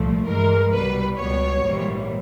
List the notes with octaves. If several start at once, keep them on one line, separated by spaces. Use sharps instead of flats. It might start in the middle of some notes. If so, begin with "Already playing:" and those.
Already playing: C2 A#2 F3 A3
G2 E3 G#3 A#4
C2 B2 G3 B4
C#2 B2 G3 B3 C#5
A#1 G#2 E3 G3 A#3